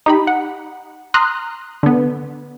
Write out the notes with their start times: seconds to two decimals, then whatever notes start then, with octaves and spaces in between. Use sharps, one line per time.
0.06 D#4 G4 B5
0.27 F#5
1.14 A#5 C6 D#6 F6 F#6
1.83 D3 B3